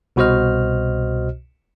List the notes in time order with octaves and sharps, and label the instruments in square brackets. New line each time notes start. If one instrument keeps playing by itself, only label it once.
[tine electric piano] C2 B2 F#4 C5 D#5 F6